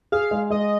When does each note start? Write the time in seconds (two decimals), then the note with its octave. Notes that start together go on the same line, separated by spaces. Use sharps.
0.12 G#4 F5
0.31 G#3
0.50 G#3 D#5